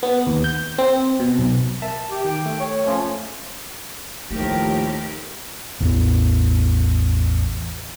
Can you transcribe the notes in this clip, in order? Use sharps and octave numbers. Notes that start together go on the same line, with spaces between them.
B3
D#2
G6
C4
B2
B1
A#4 E5 A5
G4
D#3 G5
A3
C#5
F3 A3 C#4
D#2 A2 D#3 F3 A3 G4 A#4
A1 E2